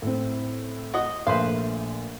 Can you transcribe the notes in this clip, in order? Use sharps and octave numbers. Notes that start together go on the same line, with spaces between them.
A2 C4
F#4 D#5
A#1 A3 B4 C5 E5 F5